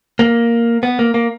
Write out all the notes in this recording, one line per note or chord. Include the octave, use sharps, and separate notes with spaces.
A#3
B3
A#3
A#3